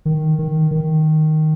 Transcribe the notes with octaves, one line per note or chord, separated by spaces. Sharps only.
D#3
D#3
D#3